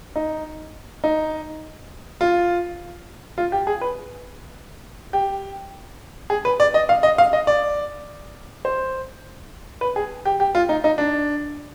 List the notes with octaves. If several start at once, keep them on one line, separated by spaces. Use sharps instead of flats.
D#4
D#4
F4
F4
G4
G#4
B4
G4
G#4
B4
D5
D#5
F5
D#5
F5
D#5
D5
C5
B4
G#4
G4
G4
F4
D#4
D#4
D4